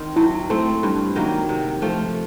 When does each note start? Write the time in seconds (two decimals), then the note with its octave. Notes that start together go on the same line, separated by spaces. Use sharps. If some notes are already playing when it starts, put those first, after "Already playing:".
Already playing: D#3 C4
0.16 F#3 E4
0.50 A3 C4
0.83 G2
1.16 D#3 F#3 A#3
1.49 C3
1.82 F3 A3